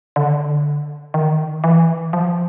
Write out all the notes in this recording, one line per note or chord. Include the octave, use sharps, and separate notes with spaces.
D3
D#3
E3
F3